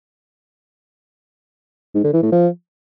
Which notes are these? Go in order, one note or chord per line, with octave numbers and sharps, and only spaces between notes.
G#2
D3
E3
A2
F3